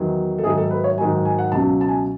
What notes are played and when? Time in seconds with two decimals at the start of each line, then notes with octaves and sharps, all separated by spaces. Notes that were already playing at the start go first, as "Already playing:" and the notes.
Already playing: E2 D#3 F#3
0.38 A4
0.44 G#2 D#3 F#3 G#4
0.58 A4
0.71 B4
0.84 C#5
0.98 G#2 D#3 F#3 G#5
1.25 G#5
1.39 F#5
1.52 C#2 B2 F#3 A5
1.81 A5
1.88 G#5